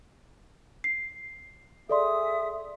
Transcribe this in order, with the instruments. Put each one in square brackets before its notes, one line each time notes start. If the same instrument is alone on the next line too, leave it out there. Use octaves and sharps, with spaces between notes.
[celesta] C7
[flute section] G#4 E5 D#6 [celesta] A4 D5 C6